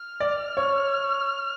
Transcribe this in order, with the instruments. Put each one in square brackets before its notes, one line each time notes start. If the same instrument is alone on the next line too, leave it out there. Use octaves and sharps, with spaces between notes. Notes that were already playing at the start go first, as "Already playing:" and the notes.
Already playing: [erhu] F6
[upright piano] D5
C#5